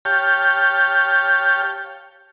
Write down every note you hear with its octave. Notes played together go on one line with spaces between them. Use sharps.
G4 C#5 F5 G5 A5